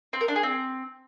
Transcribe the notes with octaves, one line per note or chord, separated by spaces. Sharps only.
C4
A#4
D4
G#4
C4